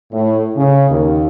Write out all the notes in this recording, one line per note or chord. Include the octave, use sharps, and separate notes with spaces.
A2
C#3
D#2